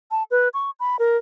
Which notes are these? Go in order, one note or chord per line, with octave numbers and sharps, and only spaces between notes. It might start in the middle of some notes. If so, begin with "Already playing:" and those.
A5
B4
C#6
B5
A#4